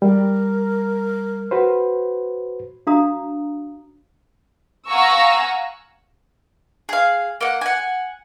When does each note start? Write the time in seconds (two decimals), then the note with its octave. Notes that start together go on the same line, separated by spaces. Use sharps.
0.02 G3 A#4
1.51 F#4 B4 C5
2.87 D4 F#4 F5 A#5 D#6
4.87 F5 F#5 G#5 A#5 C#6 E6
6.89 G#4 F5
7.41 A#3 F#5
7.61 F#5 G#5